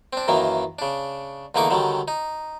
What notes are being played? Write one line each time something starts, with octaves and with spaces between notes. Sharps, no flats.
C4 D4
F#2 D#3 E3 A#3
C#3 D4
E2 D3 A#3 D#4 C#6 D6
D3 D#3 F#3 G3
D#4